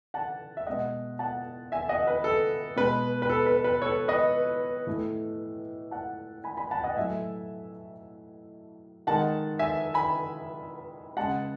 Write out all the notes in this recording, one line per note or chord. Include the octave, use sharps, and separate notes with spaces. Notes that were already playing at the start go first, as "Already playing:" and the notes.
F#5 A5
E5
B2 G#3 D#5 F#5
F#5 A5
E5 G#5
D#5 F#5
B4
A4
B2 G#3 B4
B4
A4
B4
B4
A4 C#5
B4 D#5
A2 E3 A3
F#5 A5
G#5 B5
G#5 B5
F#5 A5
G#5
D#5 F#5
A2 F#3 A3 E5 G#5
D#3 G#3 F#5 A5
E5 G#5
G#5 B5
C#3 G#3 F#5 A5